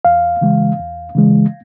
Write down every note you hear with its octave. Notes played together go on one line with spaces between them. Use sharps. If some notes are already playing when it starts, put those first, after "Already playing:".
E2 F5
C#3 E3 G#3
E2
C#3 E3 G#3